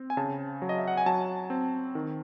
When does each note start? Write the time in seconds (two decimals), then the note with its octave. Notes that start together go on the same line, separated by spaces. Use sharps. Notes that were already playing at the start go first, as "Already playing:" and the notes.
Already playing: C4
0.10 G#5
0.17 C#3 A5
0.62 F#3
0.69 D#5
0.78 E5
0.88 F#5
0.97 G#5
1.06 F#3 A5
1.50 C4
1.95 D#3